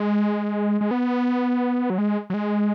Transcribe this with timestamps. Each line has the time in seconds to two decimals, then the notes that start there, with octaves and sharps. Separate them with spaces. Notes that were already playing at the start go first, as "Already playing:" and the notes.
Already playing: G#3
0.81 G#3
0.91 B3
1.90 F#3
1.98 G#3
2.30 F#3
2.34 G#3